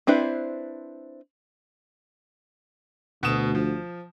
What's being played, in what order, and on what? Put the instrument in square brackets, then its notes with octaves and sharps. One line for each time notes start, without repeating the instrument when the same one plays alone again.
[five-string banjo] C4 D4 E4 B4 C5
[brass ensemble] D2 [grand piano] B2 D#6 E7
[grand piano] F3